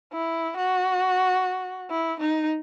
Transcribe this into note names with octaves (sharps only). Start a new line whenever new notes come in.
E4
F#4
E4
D#4